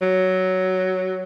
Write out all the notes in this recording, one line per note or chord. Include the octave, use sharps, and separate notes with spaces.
F#3